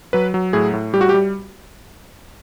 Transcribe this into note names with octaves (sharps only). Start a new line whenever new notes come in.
F#3 B4
F#3
A2 G#4
A2
G3 G4
F#4
G4
G3